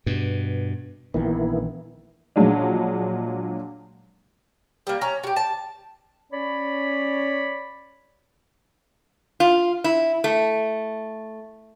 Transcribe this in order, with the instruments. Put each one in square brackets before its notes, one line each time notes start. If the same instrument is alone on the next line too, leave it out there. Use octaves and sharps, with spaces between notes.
[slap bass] G2 B2
[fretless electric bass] A#1 D#3 E3 [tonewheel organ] A#3 B3 E4
[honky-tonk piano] A#2 F3 F#3 G#3 D4
[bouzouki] G3 A#3
C#4 A#5
F#4 G4
A5
[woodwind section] C#4 C#5 D5 B5
[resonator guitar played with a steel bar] F4
E4
A3